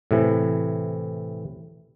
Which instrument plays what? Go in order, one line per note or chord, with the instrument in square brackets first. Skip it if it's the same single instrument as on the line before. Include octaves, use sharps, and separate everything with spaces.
[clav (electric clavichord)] A2 C3 E3